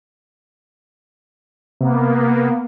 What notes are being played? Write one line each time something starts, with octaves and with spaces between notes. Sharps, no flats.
C3 A#3 B3